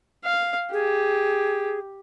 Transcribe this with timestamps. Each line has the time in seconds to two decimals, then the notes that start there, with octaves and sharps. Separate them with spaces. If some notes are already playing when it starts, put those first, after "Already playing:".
0.25 F5
0.73 G4 G#4